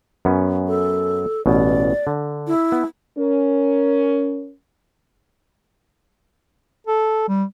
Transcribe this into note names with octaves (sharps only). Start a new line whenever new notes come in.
F#2 B3 C#4
A4
A1 B2 D5
D3
E4
B3
C#4 A#4
A4
G3